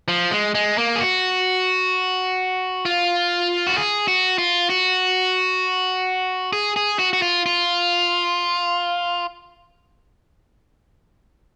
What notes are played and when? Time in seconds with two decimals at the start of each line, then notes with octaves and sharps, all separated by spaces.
0.08 F3
0.31 G#3
0.55 G#3
0.78 A#3
0.96 G#4
1.01 F#4
2.85 F4
3.67 F#4
3.77 G#4
4.08 F#4
4.38 F4
4.70 F#4
6.53 G#4
6.76 G#4
6.99 F#4
7.13 F#4
7.22 F4
7.46 F4